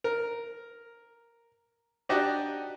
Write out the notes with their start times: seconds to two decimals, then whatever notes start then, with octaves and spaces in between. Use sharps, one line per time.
0.04 A#4
2.09 D4 D#4 F#4 G4 D#5